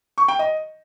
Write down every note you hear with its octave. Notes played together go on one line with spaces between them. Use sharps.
C#6
G5
D#5